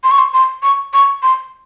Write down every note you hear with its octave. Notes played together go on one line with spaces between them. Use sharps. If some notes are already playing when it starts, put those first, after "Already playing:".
C6
C#6
C6
C6
C#6
C#6
C6